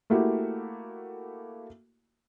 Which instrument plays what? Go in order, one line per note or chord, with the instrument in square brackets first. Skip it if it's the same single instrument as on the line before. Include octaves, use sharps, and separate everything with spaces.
[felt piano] A3 A#3 E4 F#4 G4